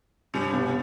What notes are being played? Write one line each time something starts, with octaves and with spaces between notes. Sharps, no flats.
G2 C3 G3
B1 B2